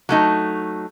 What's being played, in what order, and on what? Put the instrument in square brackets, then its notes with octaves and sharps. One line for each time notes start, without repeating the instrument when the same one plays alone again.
[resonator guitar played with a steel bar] F#3 A3 D#4